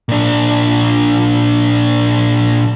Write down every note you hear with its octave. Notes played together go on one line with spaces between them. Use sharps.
A#2 D4